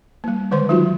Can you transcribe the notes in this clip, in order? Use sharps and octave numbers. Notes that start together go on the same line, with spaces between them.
G3 A#3
D3 D#3 G#3 B4 C5 C6
F#3 D#4 F4 F#4